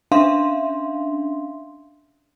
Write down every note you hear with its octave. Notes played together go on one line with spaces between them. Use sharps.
C#4 D4 E5 F5 C6